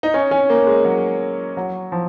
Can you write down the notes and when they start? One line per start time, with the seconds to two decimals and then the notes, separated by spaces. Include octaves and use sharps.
0.03 D#4
0.14 C#4
0.31 C#4
0.50 A#3
0.67 G#3
0.85 F#3
1.57 F#3
1.92 F3